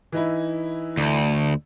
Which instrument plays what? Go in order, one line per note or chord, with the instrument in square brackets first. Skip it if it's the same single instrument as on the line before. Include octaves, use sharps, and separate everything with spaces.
[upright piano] E3 D#4 E4
[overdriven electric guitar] D2